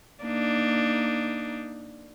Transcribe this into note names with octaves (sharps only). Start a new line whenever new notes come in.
A#3 D4 D#4